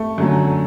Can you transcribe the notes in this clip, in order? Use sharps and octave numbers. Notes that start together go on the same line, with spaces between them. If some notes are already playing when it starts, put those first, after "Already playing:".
Already playing: A3
F#2 D3 F#3